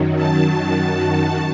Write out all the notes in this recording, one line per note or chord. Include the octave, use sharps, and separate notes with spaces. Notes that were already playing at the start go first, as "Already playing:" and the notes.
Already playing: F#2 D#3 F#3
A5
A5